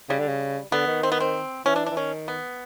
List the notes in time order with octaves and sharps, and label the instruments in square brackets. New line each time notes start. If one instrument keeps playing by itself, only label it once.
[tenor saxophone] C#3 [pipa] G3
[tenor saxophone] D3
C#3
[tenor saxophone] D3 [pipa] B3
[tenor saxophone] D#3
[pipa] C4
B3
C4
[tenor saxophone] E3 [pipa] C#4
[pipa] D4
D4
[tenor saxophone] E3
[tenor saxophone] D#3 [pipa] C#4
[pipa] B3